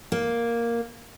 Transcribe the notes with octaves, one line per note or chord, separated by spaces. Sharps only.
A#3